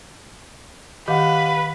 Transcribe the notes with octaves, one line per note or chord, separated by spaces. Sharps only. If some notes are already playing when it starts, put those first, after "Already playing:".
D#3 G4 B4 F5 F#5